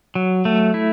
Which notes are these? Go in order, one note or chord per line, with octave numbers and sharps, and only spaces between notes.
F#3
A3
E4